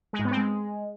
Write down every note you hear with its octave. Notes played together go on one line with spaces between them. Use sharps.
G#3
G#2
B3
C4
G#3